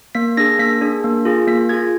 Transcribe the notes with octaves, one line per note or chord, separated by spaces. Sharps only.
A#3 B6
D4 G#4 A#6
A#3 B6
D4 G#4
A#3
F4 G#4
A#3 B6
F4 G#4 G#6